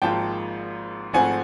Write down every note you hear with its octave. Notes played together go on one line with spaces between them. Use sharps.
G#1 G#2 F3 A#3 G5 A5
G#1 G#2 F3 A3 C4 F#5 G#5